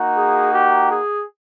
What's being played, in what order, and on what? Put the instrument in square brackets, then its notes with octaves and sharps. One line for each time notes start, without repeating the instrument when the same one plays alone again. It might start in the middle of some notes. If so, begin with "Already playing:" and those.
Already playing: [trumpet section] A#3 D#4 F#4
G#4
G4
G#4